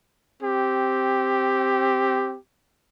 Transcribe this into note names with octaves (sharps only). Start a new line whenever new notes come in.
C4 G4